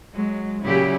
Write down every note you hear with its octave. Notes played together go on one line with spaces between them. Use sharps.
F#3 G#3
A#2 C#3 F#3 E4 G4 G#4